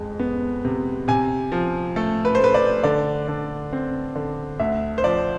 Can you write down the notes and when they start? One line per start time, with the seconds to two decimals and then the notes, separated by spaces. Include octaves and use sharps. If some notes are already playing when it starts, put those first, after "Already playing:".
Already playing: F2 G#3
0.19 B3
0.65 C3
1.08 C3 G#5
1.52 F3
1.96 A3 A4
2.25 B4
2.35 C5
2.40 A3 B4
2.54 D5
2.83 D3 D5
3.28 D3
3.73 C4
4.15 D3
4.60 D2 E5
4.98 C5
5.04 F3 D5